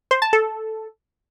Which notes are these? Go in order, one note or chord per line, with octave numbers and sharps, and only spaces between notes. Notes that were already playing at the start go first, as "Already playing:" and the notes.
C5
A5
A4